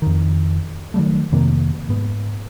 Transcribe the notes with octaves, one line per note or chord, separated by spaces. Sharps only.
F2 D#3
D#3 F#3 G3 A3
F2 C3 D#3 A#3
G#2 B3